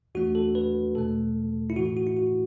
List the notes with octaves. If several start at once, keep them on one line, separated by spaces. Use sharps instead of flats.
E2 E3 A3 D4 F#4
A4
B4
E2 B2 A3 A4
E4
A2 E3 A3 F#4
F#4
E4
F#4